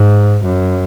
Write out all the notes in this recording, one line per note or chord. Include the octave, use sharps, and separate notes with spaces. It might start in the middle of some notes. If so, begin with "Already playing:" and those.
Already playing: G#2
F#2